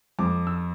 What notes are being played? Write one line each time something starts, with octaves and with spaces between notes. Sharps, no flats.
F2 D6
E6